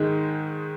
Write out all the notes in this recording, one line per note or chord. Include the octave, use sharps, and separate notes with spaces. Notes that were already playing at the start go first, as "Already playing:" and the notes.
Already playing: G#2 D#3 G#3